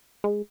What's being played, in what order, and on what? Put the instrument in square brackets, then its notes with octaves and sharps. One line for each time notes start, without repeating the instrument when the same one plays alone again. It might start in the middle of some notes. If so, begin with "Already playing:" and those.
[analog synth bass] G#3